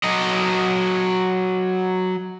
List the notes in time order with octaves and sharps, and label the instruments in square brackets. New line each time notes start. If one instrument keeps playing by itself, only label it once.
[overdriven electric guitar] F#3 D#5